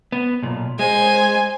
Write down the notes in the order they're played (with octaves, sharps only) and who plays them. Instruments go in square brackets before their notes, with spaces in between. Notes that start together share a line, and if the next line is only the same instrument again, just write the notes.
[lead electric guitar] B3
B1 A#2
[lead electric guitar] G#3 [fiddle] C5 G#5